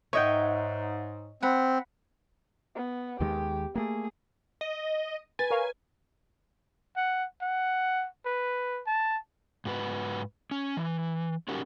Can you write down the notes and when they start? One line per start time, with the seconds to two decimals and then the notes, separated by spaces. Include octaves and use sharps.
0.13 G#2 C#5 D#5 E5 F#5 G5
1.42 C4 F#5 B5
2.75 B3
3.20 D#2 D#3 G#3 G4
3.75 A3 A#3 G#4
4.61 D#5
5.39 B4 G#5 A6
5.51 A#4 C#5 F5
6.96 F#5
7.42 F#5
8.26 B4
8.87 A5
9.65 G#2 F#4 B4
10.51 C#4
10.77 E3
11.48 C#4 D#4 F#4 G4 A#4